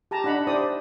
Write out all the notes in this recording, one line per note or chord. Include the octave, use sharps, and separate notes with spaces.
G4 A5 A#5
D4 D#4 F#5 B5
E4 G4 C5 D5 D#6